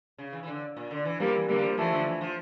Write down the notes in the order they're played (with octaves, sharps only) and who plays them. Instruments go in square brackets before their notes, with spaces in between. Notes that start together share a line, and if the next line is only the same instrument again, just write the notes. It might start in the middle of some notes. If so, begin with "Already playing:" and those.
[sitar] C#3
E3
E3
D3
A#2
D3
E3
[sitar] F3 [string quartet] G3 A#3
[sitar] E3
[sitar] D3 [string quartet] G3 A#3
[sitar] F3
[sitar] E3 [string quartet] F3 A3
[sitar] D3
E3
F3